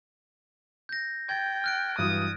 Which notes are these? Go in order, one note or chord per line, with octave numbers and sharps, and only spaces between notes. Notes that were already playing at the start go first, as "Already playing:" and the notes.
G6 A#6
G5 G#6 A6
F6 F#6 D7
G2 E3 F#3 D#6